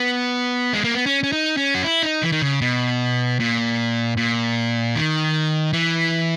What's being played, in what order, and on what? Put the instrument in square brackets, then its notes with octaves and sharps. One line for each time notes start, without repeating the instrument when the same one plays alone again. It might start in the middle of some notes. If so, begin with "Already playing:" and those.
Already playing: [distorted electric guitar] B3
G#3
A#3
B3
C#4
C#4
D#4
C#4
F#4
E4
D#4
E3
D#3
C#3
B2
A#2
A#2
D#3
E3